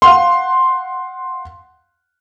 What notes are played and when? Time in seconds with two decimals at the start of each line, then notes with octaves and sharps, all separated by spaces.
0.02 F5 F#5 C6